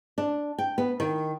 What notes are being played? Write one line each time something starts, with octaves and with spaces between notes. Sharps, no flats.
D4
G5
B3
D#3